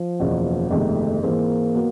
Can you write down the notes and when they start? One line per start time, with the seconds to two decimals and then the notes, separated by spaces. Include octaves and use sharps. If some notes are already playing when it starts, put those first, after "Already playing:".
Already playing: F3
0.20 F#1 E2 B2
0.71 G1 F2 C3 D#3 G#3 A3
1.23 G#2 E3 G#3 A#3 C4
1.75 F#3 B3